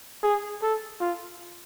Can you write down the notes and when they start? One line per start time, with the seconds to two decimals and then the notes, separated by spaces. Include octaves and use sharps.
0.23 G#4
0.62 A4
1.00 F4